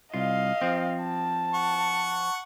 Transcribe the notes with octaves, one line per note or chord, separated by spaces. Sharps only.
C2 F4 D#5 F5
F3 C4
A5
F#5 C#6